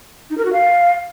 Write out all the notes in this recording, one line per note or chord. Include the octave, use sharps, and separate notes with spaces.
D#4
A#4
F#4
F5